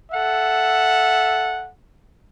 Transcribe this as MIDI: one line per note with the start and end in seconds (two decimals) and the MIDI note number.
0.12 1.69 69
0.12 1.69 76
0.12 1.69 78